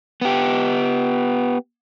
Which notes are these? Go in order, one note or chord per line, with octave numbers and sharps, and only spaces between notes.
B3 G4